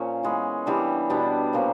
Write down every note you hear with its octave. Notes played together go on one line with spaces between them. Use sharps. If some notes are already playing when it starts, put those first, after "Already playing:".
Already playing: A#2 F3 C#4
E3 G#3 B3
E3 G3 B3 D4
B2 G3 B3 D4
A#2 F3 A#3 C#4